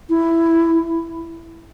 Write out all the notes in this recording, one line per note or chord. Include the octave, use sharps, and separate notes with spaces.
E4